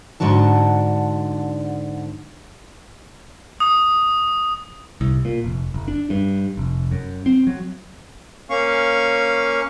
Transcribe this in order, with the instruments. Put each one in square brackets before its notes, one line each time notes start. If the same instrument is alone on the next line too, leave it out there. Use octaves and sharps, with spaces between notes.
[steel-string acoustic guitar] G#2 D3 D4 F#4 A5
[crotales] D#6
[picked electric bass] C2
A#2
F1
F#1
D4
G2
F1
F#2
C4
F#3
[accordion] A#3 C#4 F5 C#6